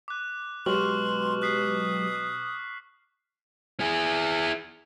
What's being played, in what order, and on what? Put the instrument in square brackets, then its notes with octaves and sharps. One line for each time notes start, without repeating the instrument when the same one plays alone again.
[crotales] D6 F#6
[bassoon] B2 [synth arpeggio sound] F#3 G#3 G4 [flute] C6 [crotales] C#6 F6 F#7
[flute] D#6 [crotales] F#6 B6 C7
[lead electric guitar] E4 G#4